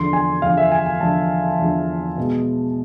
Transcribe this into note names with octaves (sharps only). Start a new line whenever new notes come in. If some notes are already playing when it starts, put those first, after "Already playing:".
Already playing: E2 D3 F3 C6
G#5
E2 D3 F3 F5
E5
G#5
G#5
E2 D3 F3 A5
E2 D3 F3
B2 G#3 B3